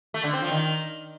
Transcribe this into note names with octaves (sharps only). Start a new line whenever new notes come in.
A3
D3
C4
F3
D#3